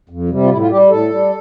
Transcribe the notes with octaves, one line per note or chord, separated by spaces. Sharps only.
F2
C3 G3
F4
A2 E4
F4
G3 G4
A2 A4
G3